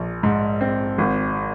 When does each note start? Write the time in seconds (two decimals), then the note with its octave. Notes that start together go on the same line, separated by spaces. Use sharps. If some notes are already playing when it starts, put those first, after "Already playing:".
Already playing: A#1
0.23 G#2
0.61 C4
0.98 G#1